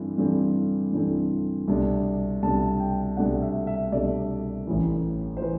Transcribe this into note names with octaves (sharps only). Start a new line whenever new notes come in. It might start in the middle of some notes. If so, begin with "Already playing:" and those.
Already playing: G2 E3 A3 C4
G2 E3 A3 C4
G2 E3 A3 C4
C2 B2 A3 D4
C2 B2 A3 D4 A5
G5
C2 B2 A3 D4 F#5
E5
E5
C2 B2 A3 D4 D5
A1 A2 E3
C5
E3 B4